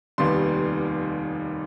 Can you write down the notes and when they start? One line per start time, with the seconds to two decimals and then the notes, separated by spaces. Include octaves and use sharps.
0.18 F1 D#2 D#3 G3 B3 C6